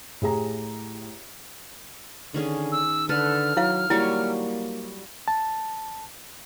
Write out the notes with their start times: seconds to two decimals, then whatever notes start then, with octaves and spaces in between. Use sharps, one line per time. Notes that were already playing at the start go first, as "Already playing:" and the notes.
0.22 A2 E4 G4 G#4 A#5
2.34 D3 D#3 C#4 G#4
2.72 E6
3.09 D3 A4 B4 F6
3.57 F#3 E4 F5
3.90 F#3 G3 A#3 E4 C#5
5.28 A5